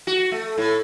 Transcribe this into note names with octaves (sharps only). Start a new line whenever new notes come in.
F#4
A3
A2